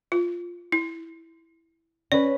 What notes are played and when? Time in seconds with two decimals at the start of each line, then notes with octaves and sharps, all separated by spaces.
0.12 F4
0.72 E4
2.12 C#4 B4 D5